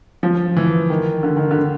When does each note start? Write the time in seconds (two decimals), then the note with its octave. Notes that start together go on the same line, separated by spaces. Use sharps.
0.23 F3
0.57 E3
0.90 D#3
1.23 D3
1.37 D#3
1.51 D3